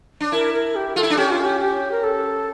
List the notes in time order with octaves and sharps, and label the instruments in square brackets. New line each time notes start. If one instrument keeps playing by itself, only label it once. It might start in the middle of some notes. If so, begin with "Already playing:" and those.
[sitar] D4
[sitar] E4 [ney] A#4
[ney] A#4
G4
[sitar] F4 [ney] A4
[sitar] E4
D4
[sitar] C#4 [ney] G4
[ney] F4
G4
G4
A#4
A4